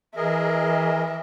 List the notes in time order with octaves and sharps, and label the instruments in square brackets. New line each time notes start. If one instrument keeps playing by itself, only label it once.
[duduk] E3 [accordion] G#4 A#4 D#5 [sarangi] E5